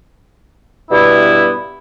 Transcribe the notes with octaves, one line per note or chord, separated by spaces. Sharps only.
G2 B2 G3 B3 E4